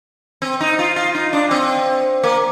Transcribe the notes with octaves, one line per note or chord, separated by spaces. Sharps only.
C4
D#4
F4
F4
D#4
D4
C4
A#3